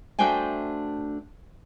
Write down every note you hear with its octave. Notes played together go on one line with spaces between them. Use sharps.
A3 D4 F#4 C5 G5 G#5